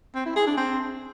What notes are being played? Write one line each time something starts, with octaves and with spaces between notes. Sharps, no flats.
C4
E4
G#4
D4
C4